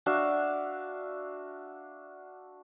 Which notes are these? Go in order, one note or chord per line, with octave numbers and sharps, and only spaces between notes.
D4 F#4 E5 F5